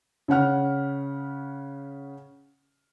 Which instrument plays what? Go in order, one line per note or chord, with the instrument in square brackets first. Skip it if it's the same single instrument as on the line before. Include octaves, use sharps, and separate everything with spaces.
[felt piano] C#3 C#4 F#5 F6